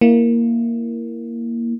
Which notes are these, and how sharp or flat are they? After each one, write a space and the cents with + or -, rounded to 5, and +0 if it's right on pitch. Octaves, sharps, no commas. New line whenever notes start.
A#3 +0 E4 +0